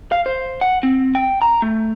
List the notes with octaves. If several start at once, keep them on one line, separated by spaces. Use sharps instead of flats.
F5
C5
F#5
C4
G5
A#5
A3